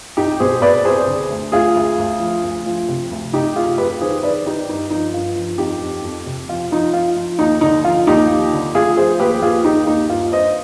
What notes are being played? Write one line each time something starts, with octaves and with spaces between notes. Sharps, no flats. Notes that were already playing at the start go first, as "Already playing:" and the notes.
C2 D#4 G4
B2 G#4 C5
B2 B4 D5
C2 G#4 C5
D3
D2
D2 F4 G#4
D2
D2
F3
D2
F3
C3
D2
C3 D#4 G4
D2 F4 G#4
F2 G4 B4
D#3 G#4 C5
D#3 B4 D5
D#3 D#4 G4
G2 D#4
F3 D#4
G2 F4
F3
F2 D#4 G4
F2
F2
C3
F3 F4
F3 D#4
F3 F4
F3
D#2 D#4
D3 D#4
F3 F4
D#2 D#4 G4
F3
D3
D2 F4 G#4
F3 G#4 C5
D#2 G4 B4
D#2 F4 G#4
D#3 D#4 G4
D#2 D#4
G2 F4
G2 C5 D#5